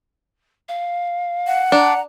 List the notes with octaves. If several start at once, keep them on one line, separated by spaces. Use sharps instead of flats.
F5
F#5
D4 A#5